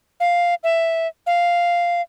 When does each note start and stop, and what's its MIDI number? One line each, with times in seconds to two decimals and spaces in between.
0.20 0.55 77
0.64 1.07 76
1.27 2.01 77